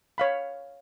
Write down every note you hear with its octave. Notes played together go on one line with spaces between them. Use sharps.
C#5 F5 B5